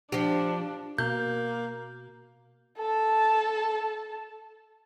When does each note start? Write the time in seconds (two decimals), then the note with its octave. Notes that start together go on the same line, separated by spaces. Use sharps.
0.12 F3 D4 G4
0.98 B2 A#3 G6
2.78 A4 A5